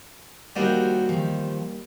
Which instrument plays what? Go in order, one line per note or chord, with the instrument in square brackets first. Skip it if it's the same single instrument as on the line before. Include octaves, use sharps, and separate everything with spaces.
[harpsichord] D#2 G3 [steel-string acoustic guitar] F3 F#4 A#4
[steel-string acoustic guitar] D#3 F3